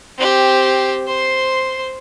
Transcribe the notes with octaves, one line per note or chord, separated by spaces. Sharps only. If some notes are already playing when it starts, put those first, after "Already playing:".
C4 G4
C5 C6